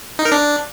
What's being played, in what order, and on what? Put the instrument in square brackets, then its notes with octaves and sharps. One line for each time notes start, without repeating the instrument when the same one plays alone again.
[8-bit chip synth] D#4
A#4
D4